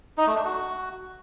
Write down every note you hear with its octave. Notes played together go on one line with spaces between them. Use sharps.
D#4
A3
D4
F#4